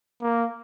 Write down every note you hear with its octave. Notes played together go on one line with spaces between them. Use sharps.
A#3